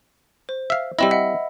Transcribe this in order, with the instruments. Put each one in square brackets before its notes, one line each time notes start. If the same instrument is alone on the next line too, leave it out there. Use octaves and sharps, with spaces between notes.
[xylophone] C5
[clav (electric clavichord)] E5 F5
[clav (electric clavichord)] G3 C4 E4 [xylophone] D#5 B5 E6
[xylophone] D#5 E5 F#5